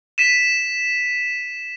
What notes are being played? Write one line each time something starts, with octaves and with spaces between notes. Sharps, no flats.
B6 D#7 E7